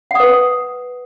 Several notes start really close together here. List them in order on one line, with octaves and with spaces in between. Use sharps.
F#5 D#6 B4